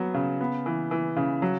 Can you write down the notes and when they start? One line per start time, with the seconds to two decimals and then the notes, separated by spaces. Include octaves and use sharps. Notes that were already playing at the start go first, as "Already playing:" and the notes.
Already playing: F#3 B3
0.14 C#3
0.41 B3
0.66 E3
0.91 E3
1.17 C#3
1.42 F#3